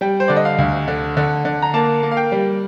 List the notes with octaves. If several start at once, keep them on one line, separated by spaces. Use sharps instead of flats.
G3 G5
C5
D3 D5
D#5
F5
D2
D3
D3
D3
A#5
A#3 A5
A#3
F5
G5
G3